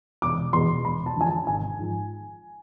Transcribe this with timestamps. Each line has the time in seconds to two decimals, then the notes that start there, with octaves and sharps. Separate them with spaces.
0.22 E1 D6
0.53 E2 B2 C6
0.85 E1 B5
1.06 A5
1.16 E2 D3 F3 G#5
1.26 A5
1.47 G#1 G#5
1.79 G#2 F3